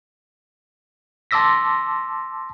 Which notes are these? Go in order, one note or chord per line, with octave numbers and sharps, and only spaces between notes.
A5 C6 D6 E6 A#6 B6